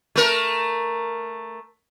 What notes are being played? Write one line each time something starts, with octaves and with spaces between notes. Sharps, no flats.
A3 A#4